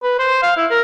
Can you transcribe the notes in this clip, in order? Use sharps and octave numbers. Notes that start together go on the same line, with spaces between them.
B4
C5
F5
E4
A#4